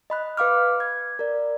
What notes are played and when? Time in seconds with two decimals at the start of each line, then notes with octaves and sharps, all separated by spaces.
0.10 D#5 B5 F#6
0.37 B4 F5 D6 F6
0.80 G#6
1.19 A#4 D5